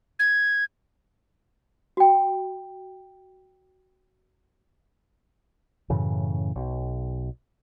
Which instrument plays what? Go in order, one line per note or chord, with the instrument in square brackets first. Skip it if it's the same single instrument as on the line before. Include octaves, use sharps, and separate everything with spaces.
[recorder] G#6
[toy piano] F#4 G5
[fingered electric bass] F#2 A2 C#3 E3
B1